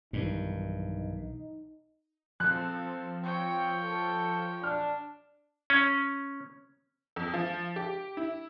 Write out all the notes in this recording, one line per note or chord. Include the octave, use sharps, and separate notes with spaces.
B1 G2 D#3 E3 D#4
F3 C4 A4 F#6
C4 C#5 G5
A4
D4 F6
C#4
F2
F3
G4
E4